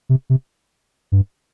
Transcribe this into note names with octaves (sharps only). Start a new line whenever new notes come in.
C3
C3
G2